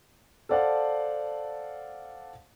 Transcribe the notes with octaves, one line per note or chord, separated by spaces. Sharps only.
A4 C5 D5 F5 F#5 A5